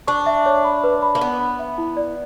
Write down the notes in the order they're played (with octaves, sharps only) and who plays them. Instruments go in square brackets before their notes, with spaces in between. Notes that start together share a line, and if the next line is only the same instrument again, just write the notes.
[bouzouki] D4 [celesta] C#6
[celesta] E5
C#5
B5
B4
B5
[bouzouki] A#3
[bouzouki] B3 [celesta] B5
[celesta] B5
E5
E4
D5